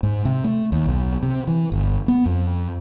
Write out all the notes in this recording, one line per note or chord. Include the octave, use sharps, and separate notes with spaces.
G#2
C3
A3
D#2
B1
C3
E3
G1
B3
F2